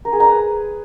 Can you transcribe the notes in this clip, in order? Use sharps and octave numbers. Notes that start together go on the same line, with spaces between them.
A#4
G#4
A#5
B4